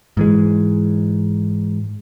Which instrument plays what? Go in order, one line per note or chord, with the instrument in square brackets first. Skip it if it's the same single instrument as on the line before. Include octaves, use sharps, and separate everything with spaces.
[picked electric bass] G#2 E3 G#3